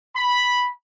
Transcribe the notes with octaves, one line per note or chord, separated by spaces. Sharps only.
B5